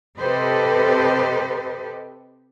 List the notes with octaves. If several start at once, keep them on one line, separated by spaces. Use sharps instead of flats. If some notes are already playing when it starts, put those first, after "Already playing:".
C3 G4 A4 B4 C5 D#5